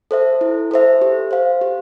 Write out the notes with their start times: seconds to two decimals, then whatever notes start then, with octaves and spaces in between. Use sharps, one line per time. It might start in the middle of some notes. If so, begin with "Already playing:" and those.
0.11 A4 C5 E5
0.41 E4
0.71 A4 C5 E5
1.01 G4
1.31 C5 F5
1.61 G4